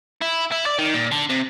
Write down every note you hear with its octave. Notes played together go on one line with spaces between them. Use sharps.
E4
E4
D5
D#3
A#2
D3
C3